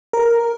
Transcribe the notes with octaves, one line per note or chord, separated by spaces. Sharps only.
A#4